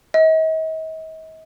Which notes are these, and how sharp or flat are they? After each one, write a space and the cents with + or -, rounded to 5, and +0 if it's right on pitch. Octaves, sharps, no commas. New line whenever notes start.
D#5 +45